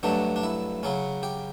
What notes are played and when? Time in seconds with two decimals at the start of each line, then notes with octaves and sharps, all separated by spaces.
0.03 G2 F#3 A3 D4
0.36 D4
0.43 E4
0.83 C#3 F#3 C#4
1.23 G4